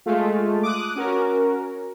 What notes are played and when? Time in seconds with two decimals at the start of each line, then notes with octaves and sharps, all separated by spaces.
0.06 G#3 A3 F4
0.63 D6 D#6 F#6
0.95 C#4 F#4 A#4